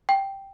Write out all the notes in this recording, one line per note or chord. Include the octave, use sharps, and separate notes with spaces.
G5